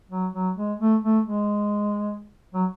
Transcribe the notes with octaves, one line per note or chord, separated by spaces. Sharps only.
F#3
F#3
G#3
A3
A3
G#3
F#3